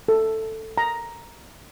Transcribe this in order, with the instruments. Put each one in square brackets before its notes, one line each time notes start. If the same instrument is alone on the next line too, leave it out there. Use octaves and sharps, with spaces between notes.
[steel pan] A4
A#5